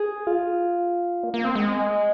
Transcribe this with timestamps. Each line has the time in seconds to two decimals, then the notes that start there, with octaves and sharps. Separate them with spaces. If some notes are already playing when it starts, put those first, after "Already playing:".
Already playing: G#4
0.27 F4
1.23 A#3
1.34 A#3
1.45 C4
1.55 G#3